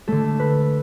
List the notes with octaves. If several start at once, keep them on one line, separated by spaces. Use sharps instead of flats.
D3 A3 A4
B4